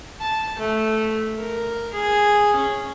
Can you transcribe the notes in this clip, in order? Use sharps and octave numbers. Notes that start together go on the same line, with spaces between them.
A5
A3
A#4
G#4
C#4